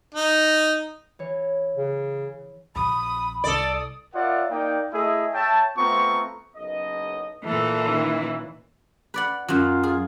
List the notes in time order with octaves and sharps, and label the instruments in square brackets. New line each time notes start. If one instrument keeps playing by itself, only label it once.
[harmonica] D#4
[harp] E3 C#5
[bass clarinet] C#3
[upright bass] A#1 C4 [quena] B5 [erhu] D#6
[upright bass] C2 [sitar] A4 D5 [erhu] D#6
[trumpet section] F4 A#4 C#5 D5 E5 F#5
A#3 D#4 D5 G5
A3 E4 G#4 D#5 E5
C#5 E5 G5 A5
A3 B3 C4 F4 A#5 C#6
[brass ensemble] F#1 B1 D#5
[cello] A#2 E3 [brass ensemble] A4
[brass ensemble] D#3 C#4 E4
[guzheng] B4 D5 F#5
[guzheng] F#2 F#3 [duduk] F4
[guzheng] G#4